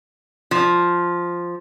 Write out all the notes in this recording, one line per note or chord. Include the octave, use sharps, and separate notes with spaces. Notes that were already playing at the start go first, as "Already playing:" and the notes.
F3